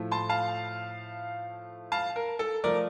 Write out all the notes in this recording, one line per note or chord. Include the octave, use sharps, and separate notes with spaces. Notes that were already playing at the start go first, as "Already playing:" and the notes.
Already playing: A2 F3 A3
A5 C6
F5 A5
F5 A5
A#4
A4
F3 A3 A#4 D5